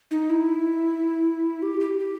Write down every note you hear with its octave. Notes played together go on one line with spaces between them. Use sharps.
D#4
E4
G4
G4
G4